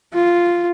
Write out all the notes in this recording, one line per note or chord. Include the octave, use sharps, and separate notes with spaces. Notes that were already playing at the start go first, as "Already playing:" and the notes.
F4